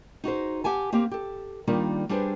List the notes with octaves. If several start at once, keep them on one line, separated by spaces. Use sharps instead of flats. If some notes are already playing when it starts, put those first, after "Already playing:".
D#4 F#4 G#4 C5
G4 F#5 G#5 A5
A#3 C4 G4
G4 A4
D#3 G3 A#3 D4 D#4 F4
G3 D4 G4 G#4 B4 C5